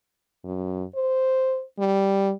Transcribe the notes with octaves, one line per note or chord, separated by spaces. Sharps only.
F#2
C5
G3